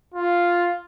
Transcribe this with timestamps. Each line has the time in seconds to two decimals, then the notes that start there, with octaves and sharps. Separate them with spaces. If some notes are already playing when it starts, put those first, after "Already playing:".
0.14 F4